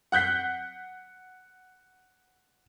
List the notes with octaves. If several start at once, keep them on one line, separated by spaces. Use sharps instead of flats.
F#5 F#6 G6 B6 C7